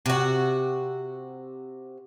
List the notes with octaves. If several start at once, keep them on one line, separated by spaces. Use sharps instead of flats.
C3 F#4